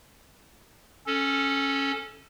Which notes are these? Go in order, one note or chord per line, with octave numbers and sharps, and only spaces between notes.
C#4 A4